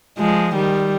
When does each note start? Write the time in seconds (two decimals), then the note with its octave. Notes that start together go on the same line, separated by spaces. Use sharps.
0.19 F3 G#3
0.55 D#3 G3